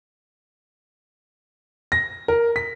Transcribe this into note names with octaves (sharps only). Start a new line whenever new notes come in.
A#6
A#4
B6